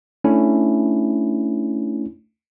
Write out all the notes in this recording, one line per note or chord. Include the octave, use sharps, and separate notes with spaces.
A3 C#4 D4 E4